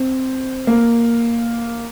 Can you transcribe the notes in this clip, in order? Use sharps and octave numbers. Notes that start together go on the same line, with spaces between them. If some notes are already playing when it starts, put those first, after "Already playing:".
Already playing: C4
A#3